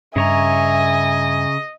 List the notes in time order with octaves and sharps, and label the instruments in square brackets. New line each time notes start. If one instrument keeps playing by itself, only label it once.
[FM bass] G2 [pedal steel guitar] C#3 C#5 A#5 [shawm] D#5 [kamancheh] E5 G#5